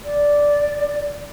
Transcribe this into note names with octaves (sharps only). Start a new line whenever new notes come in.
D5